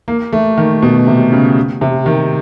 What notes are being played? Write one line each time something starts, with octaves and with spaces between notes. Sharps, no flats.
A#3
A3
D#3
B2
C3
C#3
C3
D#3